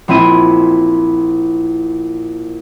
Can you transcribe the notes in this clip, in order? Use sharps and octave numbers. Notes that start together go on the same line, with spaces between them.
A#1 C4 E4 D#7